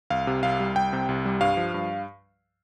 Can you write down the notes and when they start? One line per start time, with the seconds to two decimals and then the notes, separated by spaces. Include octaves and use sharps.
0.10 C2 F5
0.27 C3
0.43 C2 F5
0.60 G3
0.76 C2 G5
0.93 C3
1.09 C2
1.25 G3
1.41 G2 F5
1.57 F3
1.74 G2